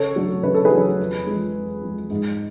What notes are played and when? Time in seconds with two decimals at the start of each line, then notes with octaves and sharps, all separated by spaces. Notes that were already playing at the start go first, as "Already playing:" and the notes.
Already playing: C#3 A4 C#5
0.16 F#3 A3 D4
0.43 C#3 B4
0.54 A4
0.65 G#4 B4
0.72 F#3 A3 D4
0.99 F2
1.26 F3 G#3
1.55 F2
1.83 F3 G#3
2.11 G#2